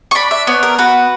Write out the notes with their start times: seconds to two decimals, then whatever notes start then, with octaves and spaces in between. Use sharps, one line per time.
0.11 C#6
0.15 D4 B5
0.31 E5
0.47 B3 C#5
0.63 A#4
0.79 F#4 B4